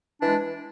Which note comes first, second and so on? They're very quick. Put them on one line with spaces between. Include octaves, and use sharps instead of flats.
D4 E3 G#3